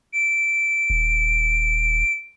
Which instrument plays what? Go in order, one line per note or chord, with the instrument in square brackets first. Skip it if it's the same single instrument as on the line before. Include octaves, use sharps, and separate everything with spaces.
[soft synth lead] D7
[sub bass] D#1